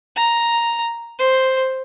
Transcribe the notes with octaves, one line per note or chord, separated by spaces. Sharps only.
A#5
C5